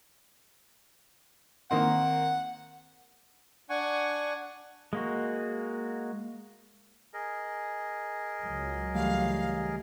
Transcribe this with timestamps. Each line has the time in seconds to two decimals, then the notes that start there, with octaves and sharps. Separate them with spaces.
1.71 D#3 A#3 C4 F#5
3.70 D4 F#5 G#5 C#6
4.93 G#3 A#3 F#4
7.14 G#4 A#4 D#5
8.45 C#2 F#3
8.95 E3 G3 A3 F5